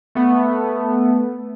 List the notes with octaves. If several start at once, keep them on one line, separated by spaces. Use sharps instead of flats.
A3 B3